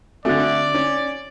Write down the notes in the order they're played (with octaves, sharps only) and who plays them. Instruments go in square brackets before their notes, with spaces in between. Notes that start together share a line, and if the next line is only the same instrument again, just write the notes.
[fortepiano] D3 A3 [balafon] C4 F#4 [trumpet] D5
[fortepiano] C#4